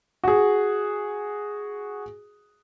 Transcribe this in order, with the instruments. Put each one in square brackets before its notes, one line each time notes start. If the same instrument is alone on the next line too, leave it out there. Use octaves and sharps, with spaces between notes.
[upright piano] F#4 G#4